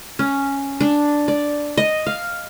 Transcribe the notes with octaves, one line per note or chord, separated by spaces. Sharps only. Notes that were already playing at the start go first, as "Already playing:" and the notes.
C#4
D4
D5
D#5
F5